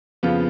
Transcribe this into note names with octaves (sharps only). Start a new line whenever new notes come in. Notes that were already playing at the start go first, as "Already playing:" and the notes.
F2 C#3 F3 B3 F4